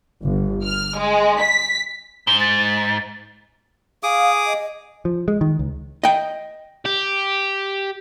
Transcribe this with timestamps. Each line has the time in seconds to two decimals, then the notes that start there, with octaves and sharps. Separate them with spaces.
0.22 G1
0.65 F6
0.99 G#3
1.41 B6
2.27 G#2 G7
2.41 A6
4.03 G#4 F5 D6 D#6
4.46 D#5
5.05 F3
5.28 G#3
5.41 D#3
5.59 C#2
6.04 D#5 G5
6.85 G4